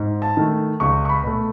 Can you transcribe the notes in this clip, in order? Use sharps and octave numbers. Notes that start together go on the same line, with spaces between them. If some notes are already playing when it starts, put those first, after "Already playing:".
Already playing: G#2
A5
D#3 A3
C#2 C#6
C#6
B5
B2 A3